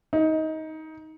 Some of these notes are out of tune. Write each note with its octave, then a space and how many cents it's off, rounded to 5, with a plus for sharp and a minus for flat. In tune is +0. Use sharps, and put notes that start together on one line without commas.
D#4 +20